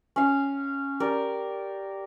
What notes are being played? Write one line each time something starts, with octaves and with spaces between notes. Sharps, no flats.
C#4 F5
G4 A#4 D5